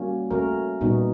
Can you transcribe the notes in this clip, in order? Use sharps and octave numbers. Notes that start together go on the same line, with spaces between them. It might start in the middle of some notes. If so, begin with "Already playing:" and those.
Already playing: G3 A#3 C#4 F#4
A3 C#4 F#4 A#4
A#2 G3 B3 D#4 F#4